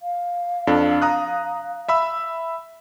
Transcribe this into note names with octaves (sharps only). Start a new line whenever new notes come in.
F5
F2 D4 A4
A#5 D#6 F#6
E5 B5 E6